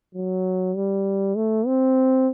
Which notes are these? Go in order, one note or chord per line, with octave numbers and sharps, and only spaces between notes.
F#3
G3
A3
C4